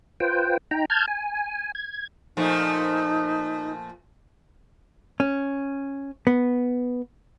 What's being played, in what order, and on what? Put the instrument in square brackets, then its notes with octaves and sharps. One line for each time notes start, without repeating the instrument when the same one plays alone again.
[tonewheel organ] F4 B4 C5 G5
D#4 G5 A#5
A5 F6 G6 G#6
G#5
G#6
[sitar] A#2 F3 A3 [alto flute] D#4
[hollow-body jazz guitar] C#4
B3